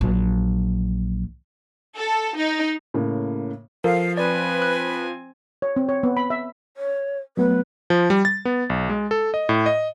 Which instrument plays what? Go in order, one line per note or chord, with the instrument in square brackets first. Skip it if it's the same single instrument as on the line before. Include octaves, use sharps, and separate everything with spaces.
[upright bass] A#1 F#3
[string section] A4
D#4
[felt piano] A2 C#3 A#3
[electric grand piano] F3 [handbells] A4 A#4 [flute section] F5
[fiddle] C4 G#5 [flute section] B4 [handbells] D5
[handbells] F#6
[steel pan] C#5
C4
C#5
B3
B5
E5
[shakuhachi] C#5
[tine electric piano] F#3 A3 B3 [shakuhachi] B4
[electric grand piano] F3
G3
A6
B3
B1
G#3
A4
D#5
A2
D#5